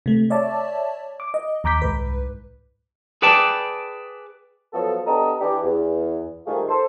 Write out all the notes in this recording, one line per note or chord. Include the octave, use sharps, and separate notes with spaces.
C3 A3
C#5 D5 E5 A5
D6
D#5
D#2 A#5 D6 G6 B6
C2 G#2 B4
G#4 B4 D5 G5 A5
F3 F#3 B3 A4
B3 D4 G4 A4 D#5 A#5
E3 D4 G4
E2
G#2 D#3 G3 A3 F4 G#4
A4 C5